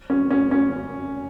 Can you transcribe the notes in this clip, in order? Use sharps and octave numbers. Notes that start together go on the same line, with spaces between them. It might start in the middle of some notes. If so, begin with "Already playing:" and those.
C#4
C#4
C#4